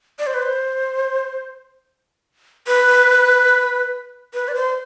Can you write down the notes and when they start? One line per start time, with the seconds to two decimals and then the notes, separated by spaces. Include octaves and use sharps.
0.19 D5
0.27 C5
0.34 B4
0.42 C5
2.67 B4
4.34 B4
4.48 D5
4.55 C5